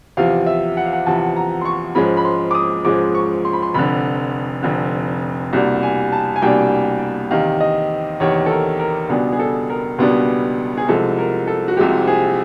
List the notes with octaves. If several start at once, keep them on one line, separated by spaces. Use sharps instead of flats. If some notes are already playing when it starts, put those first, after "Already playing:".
E2 C3 F3 F5
E5
F#5
F5
F#5
E2 C3 F3 A5
A#5
C6
C#6
G#2 F3 G#3 C#4 B5
B5
C6
D6
D#6
G#2 F3 G#3 C#4 D6
C#6
C6
B5
C6
F1 F2 D3 B5
F1 F2 D3
C2 B2 G3 A#3 D4
G#5
A5
G#5
C2 B2 G3 A#3 D4 G5
E2 C3 D#3 F5
D#5
E2 C3 D#3 C#5
A4
A#4
A#4
C#2 B2 G3 B3 D4 G#4
G#4
A4
A#4
C#2 B2 G3 B3 D4
G#4
C2 C3 F3 G#3 A4
A#4
A4
F#4
C2 C3 F3 G#3 G4
G#4